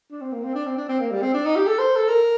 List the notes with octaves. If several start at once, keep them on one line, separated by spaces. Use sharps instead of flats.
D4
C4
A#3
C4
D4
C4
D4
C4
A#3
G3
C4
D4
D#4
G4
A4
C5
A4
A#4